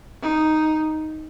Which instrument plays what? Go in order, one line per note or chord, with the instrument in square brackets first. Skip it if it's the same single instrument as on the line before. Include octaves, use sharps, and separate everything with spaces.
[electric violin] D#4